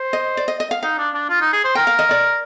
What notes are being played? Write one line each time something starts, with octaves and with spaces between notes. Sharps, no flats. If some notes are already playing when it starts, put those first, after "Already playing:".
Already playing: C5
D#5
D5
D#5
D#5
F5
D#4 F5
D4
D4
F4
D#4
G#4
C5
A#4 G5
F5
D#5
D5